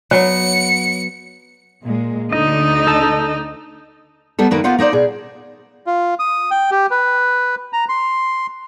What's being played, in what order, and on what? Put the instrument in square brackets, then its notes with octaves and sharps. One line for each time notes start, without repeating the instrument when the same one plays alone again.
[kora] F#3 B3 [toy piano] C#5 [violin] C#7
[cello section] A#2 G#3
[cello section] D2 D3 D5 [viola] D#4 [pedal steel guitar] D#5
[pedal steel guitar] A4 A5
[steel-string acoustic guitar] G3 B3 A4
F#2 D#3 A#3 B4
A#3 B3 F4 C5 F5 F#5
A#3 D#4 C5 D5
B2 G#4
[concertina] F4
D#6
G5
G4
B4
A#5
C6